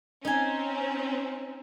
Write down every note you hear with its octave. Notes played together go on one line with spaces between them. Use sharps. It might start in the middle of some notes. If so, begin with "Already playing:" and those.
C4 C#4 D#4 G#5